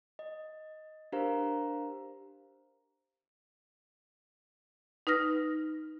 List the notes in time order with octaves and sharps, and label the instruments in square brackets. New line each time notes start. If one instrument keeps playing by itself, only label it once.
[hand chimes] D#5
D4 G4 A#4 C5 F5 A#5
[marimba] D#4 B4 D#6 F6 A#6